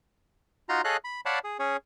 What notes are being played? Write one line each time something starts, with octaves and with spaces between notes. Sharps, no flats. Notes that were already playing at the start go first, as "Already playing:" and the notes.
D#4 F4 F#4 A#5 C6
G#4 A4 C#5 D#5 F5 F#6
B5
C#5 D5 F5 F#5 A5 B5
G#4
C#4 G#4 C#5